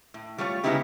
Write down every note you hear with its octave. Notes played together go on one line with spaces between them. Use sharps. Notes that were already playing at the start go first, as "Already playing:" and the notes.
A2
G3 A3 F4 C#5
C#3 G#3 B3 D#4 E4 G4